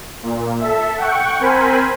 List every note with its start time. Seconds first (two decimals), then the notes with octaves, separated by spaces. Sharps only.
0.23 A#2
0.60 A4 E5
0.98 F#5 G5 C#6
1.40 C4 A#4 C5 G#5 B5